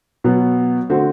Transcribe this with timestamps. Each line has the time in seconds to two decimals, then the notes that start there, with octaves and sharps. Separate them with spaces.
0.24 B2 F#3 B3
0.90 D3 A3 C4 F#4 C5